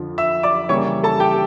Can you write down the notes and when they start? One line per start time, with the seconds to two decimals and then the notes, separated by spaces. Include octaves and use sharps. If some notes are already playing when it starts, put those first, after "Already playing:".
Already playing: F2 D3 F3
0.18 E5 E6
0.43 D5 D6
0.69 C#3 E3 G3 A#3 C#5 C#6
1.04 A4 A5
1.20 G4 G5